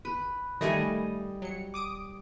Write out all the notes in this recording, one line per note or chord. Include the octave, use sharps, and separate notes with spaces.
B4
D#3 G3 A3 D#5 G#5
F#3 C#7
D6 D#6 D7